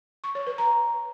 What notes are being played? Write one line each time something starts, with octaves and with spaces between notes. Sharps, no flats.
C#6
C#5
B4
A#5